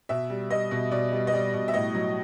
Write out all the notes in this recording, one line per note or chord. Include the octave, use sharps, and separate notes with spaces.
B2 E5
G3
G3 D#5
B2
B2 D5
G3
D#5
G3 D5
B2
E5
A2 D#5
F#3